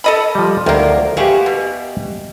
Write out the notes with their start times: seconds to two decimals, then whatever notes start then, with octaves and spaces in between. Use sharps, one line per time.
0.04 A4 D#5 B5
0.35 F3 G3
0.66 D2 D#3 A#3
1.17 G#3 B3 F#4 G4 E5 F5
1.46 B2